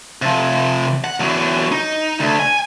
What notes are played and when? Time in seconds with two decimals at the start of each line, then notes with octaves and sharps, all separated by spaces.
0.22 C3 F3
1.04 F#5
1.20 E2 F#3
1.72 D#4
2.20 D2
2.39 G#5